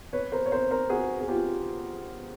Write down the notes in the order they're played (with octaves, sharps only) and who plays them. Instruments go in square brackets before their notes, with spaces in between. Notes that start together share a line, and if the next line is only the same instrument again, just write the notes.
[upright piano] B4 C#5
A#4 C5
C#5
A#4 C5
A#4 C5
F#4 G#4
G#4
F4 G4